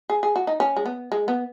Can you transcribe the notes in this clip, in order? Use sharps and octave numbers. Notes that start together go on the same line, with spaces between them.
G#4
G#4
F#4
D#4
C#4
G#3
B3
G#3
B3